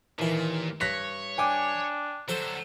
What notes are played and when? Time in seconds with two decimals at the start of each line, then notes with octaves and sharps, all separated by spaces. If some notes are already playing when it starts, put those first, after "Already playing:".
0.19 D#2 A#2 E3
0.81 G2 C#5 F#6 A#6 B6
1.38 D4 G5 G#5 D6
2.29 D3 F#3 A4 C5